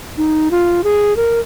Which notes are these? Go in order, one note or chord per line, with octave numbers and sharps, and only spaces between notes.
D#4
F4
G#4
A#4